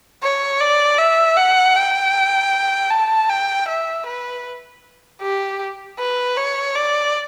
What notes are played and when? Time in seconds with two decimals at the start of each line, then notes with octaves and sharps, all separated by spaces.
0.22 C#5
0.61 D5
0.98 E5
1.37 F#5
1.76 G5
2.90 A5
3.29 G5
3.68 E5
4.06 B4
5.22 G4
5.99 B4
6.37 C#5
6.75 D5